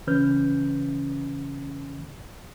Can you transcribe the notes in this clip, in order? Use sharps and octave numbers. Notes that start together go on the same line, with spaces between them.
C#3 E3 C#4 B4 F6 G6